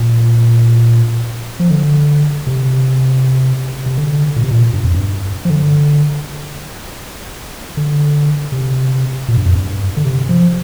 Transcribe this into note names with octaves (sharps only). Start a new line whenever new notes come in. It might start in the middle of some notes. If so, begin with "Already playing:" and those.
Already playing: A#2
F3
D3
C3
C3
D3
A#2
C3
A#2
G2
F2
G2
F3
D3
D3
C3
A#2
G2
F2
G2
D3
C3
F3